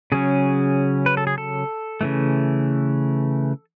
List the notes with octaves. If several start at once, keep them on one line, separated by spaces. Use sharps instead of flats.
C#3 F#3 C#4 G#4
B4
A4
G#4
A4
C#3 E3 A3